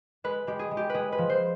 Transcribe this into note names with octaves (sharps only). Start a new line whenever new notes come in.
G#3 B4
G#3 G4
G#4
G#3
G4
G#3 G#4 B4
B4
F3
C5